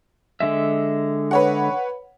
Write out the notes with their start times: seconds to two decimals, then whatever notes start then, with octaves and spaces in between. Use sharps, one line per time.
0.40 D3 G#3 E5
1.31 B4 C#5 F#5